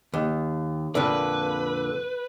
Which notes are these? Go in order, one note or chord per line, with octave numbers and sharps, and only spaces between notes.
D#2
F2 A#2 D3 B4